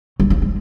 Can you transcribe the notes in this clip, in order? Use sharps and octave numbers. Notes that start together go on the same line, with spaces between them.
F#3
F3
G#3